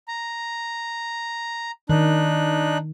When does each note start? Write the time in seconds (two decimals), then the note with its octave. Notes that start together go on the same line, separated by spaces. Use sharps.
0.08 A#5
1.89 D#3 D4 D#4 F#6